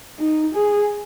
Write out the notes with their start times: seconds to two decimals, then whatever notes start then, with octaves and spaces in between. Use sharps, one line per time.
0.19 D#4
0.55 G#4